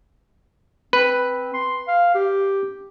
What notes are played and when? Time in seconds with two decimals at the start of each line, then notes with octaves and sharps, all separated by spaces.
0.93 C4 B4
1.54 C6
1.88 F5
2.15 G4